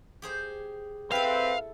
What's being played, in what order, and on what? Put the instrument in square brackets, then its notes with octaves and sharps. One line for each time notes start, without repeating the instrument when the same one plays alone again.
[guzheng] G4 G#4 C5
[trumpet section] C4 B4 [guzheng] E4 A4 [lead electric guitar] F5